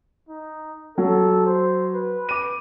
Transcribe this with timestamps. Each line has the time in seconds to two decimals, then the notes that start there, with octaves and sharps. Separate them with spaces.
0.29 D#4
0.98 F#3 A4
1.46 C5
1.94 B4
2.29 D6 D#7